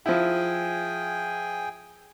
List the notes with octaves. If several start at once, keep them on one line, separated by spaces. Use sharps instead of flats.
F3 E4 G#4 G5 G#5